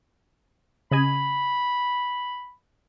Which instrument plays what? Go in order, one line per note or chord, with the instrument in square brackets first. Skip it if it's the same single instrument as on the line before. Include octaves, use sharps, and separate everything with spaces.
[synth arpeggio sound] C#3 D#5 G#5 [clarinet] B5